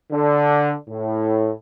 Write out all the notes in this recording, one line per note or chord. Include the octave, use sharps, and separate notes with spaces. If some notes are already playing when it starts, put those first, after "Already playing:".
D3
A2